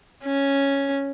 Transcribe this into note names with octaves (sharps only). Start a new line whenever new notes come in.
C#4